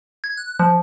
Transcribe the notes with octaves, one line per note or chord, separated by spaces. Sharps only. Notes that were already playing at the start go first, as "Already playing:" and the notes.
G#6
F#6
F3